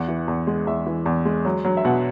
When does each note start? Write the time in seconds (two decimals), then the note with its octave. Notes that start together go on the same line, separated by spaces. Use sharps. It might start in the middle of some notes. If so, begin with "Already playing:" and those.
Already playing: E2 F#5
0.08 E3
0.28 E2
0.47 G#3
0.67 E2 E5
0.86 E3
1.06 E2
1.25 G#3
1.45 F#3
1.65 F#3
1.77 E5
1.85 B2 F#5